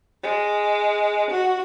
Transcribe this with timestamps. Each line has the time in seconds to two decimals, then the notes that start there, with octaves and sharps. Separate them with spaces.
0.22 G#3
1.30 F#4